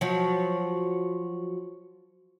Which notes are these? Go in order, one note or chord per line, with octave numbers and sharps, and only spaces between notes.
F3 F#3